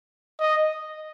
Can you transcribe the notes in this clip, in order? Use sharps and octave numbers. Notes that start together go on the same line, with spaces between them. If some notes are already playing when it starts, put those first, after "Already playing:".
D#5